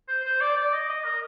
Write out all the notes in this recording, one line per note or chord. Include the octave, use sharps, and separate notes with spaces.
C5
C5
D5
D5
D#5
D#5
A#4